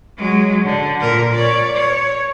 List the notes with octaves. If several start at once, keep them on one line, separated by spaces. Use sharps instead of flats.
F#3 G#3
D3
A#2 A#4
C#5 D5
C#5